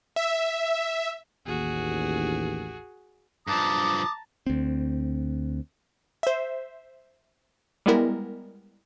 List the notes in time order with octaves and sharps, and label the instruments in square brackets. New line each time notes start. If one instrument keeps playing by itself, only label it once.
[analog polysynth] E5
[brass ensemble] A1 D#2 [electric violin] F#4 G#4
[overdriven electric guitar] G2 F3 [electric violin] A5 A#5 [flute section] D6 D#6
[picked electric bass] D2 C4
[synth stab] C5 E5
G3 G#3 B3 E4 A#4